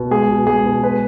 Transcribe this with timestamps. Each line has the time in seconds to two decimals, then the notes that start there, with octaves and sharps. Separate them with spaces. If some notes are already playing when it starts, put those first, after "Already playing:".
Already playing: B2
0.11 G#3 G#4
0.29 B2
0.47 G#3 G#4
0.65 B2
0.83 G#3 B4